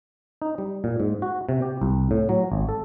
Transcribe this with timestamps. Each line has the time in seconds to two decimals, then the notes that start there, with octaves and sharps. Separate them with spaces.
0.42 D#4
0.58 G3
0.84 A#2
1.00 G#2
1.22 F#4
1.49 C3
1.62 G4
1.82 C2
2.11 A2
2.29 F#3
2.52 G#1
2.69 A4